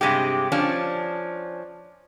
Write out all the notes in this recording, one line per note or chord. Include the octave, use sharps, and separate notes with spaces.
G2 C3 G#3 G4
F3 C#4 D4